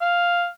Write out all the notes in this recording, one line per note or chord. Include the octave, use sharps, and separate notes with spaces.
F5